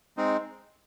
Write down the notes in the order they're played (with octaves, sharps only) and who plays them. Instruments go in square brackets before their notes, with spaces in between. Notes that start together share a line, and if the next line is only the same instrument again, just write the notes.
[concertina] G#3 C4 D#4